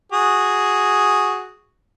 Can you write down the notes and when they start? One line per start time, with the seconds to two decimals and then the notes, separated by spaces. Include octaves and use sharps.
0.12 F#4 G#4